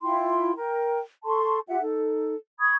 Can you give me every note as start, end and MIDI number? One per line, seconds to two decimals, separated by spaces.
0.01 0.52 64
0.01 0.52 65
0.01 0.52 79
0.01 0.52 84
0.55 1.00 70
0.55 1.00 79
1.24 1.58 69
1.24 1.58 81
1.24 1.58 84
1.24 1.58 85
1.68 1.79 65
1.68 1.79 67
1.68 1.79 76
1.68 1.79 78
1.80 2.35 63
1.80 2.35 69
2.60 2.75 83
2.60 2.75 85
2.60 2.75 87
2.60 2.75 92